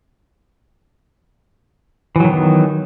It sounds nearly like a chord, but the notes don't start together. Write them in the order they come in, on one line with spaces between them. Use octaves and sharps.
E3 F#3 D#3 B3